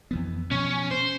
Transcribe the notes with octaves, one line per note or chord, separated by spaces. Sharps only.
F2 E3 B3
B2 F3 C#4
C5